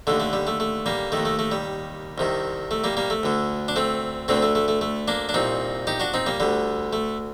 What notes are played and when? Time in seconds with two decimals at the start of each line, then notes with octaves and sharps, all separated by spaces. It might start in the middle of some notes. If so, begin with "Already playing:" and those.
0.07 D#2 D3 A3
0.20 A3
0.33 G3
0.47 A3
0.60 A3
0.86 G3 A#3
1.12 D#3 A3
1.17 D#2
1.25 A3
1.39 A3
1.52 G3
2.18 C2 C3 D#3
2.71 A3
2.84 G3 A#3
2.97 G3 A#3
3.10 A3
3.23 D2 D3
3.68 D4
3.76 A3 C4
4.28 D2 D3 A3 C4
4.42 A3
4.55 A3
4.68 A3
4.81 A3
5.08 A#3 D4
5.29 D4
5.34 C2 A#2 C4 D#4
5.87 D#4 G4
6.00 D4 F#4
6.14 C4 D#4
6.26 G3 A#3
6.40 D2 D3 G3
6.93 A3